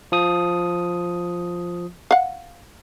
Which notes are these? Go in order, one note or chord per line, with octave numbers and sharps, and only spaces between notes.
F3 D#6
F5 F#5